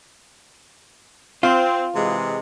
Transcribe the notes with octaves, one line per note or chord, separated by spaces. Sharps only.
C4 F4
C3 E3 G#3